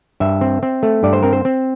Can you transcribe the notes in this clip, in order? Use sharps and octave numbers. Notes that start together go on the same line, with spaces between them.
G2 E5
C4
C4
A3
G2 D5
C5
C4 A#4
C5
C4